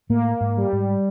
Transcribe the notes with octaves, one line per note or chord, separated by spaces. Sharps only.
A2 A3 A#3
G#2 G#3
G3
G#2 G#3